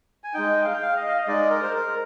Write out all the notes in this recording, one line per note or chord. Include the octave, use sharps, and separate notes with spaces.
G#5
G#3 D#4 G5
F5
G5
F5
D#5
F5
D#5
G#3 D#4 D5
A#4
C5
A#4